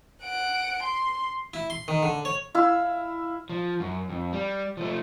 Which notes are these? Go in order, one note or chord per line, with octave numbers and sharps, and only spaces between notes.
F#5 D7
C6
E4
C6
D#3
D3
C#5
E4 F5 E6
F3
F#2
F2
G3
F3 A3